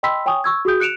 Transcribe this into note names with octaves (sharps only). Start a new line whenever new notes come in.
D#5 G5 B5 C6 E6 B6
C#5 G5 G#5 C#6 D#6
C#6 E6 G#6
F#4 G#4 D#6 G6
F#6 C#7 D7 E7 F7